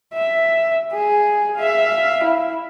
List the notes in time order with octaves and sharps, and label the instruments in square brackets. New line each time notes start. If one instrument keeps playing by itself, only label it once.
[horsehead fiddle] E5
G#4
E5 F5
E4